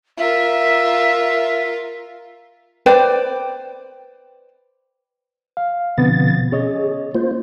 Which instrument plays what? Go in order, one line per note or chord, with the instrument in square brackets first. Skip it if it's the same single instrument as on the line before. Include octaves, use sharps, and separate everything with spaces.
[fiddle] F4 A#4 [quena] E5
[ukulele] B4 C5 D5 G5
[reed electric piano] F5
[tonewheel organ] B2 F3 A6 [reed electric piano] D3 B3 C4
[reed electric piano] C#4 C#5 D#5 [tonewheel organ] G#4
[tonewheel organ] A#3 F4 C5